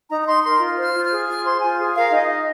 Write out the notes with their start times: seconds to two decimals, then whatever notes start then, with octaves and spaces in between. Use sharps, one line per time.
0.10 D#4 A#5
0.21 A#5
0.27 D#4 C6
0.44 A#4 C6
0.60 F4
0.78 C5
0.83 F6
0.94 F4
1.05 F6
1.11 G#4
1.27 F4 F6
1.45 C5 C6
1.61 F4 G#5
1.78 G#4
1.95 A#4 F5
2.11 D#4
2.17 D#5
2.28 D#4